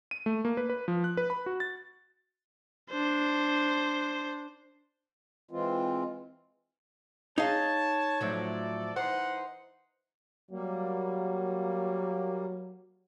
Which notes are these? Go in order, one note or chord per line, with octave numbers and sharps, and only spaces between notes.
D#7
A3
A#3
B4
B4
F3
F#6
B4
B5
F#4
A6
D4 C5
E3 G#3 C4 F4
D#4 G#4 C#5 F5 A5
A2 F3 F#3 A4 D5
E3 D#4 C5 F#5 C6
F#3 G3 A#3